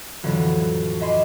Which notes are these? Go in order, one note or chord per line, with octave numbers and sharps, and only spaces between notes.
F2 A2 D3 E3 F#3
D#5 E5 G#5 B5 C6 D6